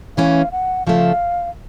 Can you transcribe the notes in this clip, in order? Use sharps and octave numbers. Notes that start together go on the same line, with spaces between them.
C#3 E3 A3 C#4 F5
F#5
C#3 F3 A3 F5